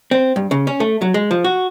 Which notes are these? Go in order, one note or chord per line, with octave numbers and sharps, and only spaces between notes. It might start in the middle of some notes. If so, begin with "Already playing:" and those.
C4
G2
C#3
C#4
A3
F#3
G#3
F3
F#4